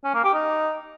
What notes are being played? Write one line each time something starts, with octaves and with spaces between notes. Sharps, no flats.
C#4
A#3
G4
D#4